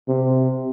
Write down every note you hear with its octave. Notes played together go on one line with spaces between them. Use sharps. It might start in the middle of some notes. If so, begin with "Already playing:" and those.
C3